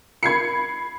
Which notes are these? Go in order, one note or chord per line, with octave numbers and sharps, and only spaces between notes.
B5 G#6 C7 C#7